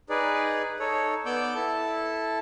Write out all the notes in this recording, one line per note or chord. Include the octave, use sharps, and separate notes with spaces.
D#4 G#4 B4 D5
D#4 A4 C#5
B3 D5 D6 E6 G6
E4 A4 A5